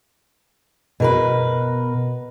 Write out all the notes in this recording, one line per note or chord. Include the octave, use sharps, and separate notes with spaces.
B2 A#4 B4